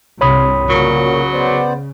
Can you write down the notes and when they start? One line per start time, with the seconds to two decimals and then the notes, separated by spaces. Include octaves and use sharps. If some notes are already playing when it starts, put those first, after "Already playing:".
0.21 C2 G2 C3 C#5 B5 D#6
0.69 A#2 C#3 F#3 F#4 A#4
1.33 B3 C5 D5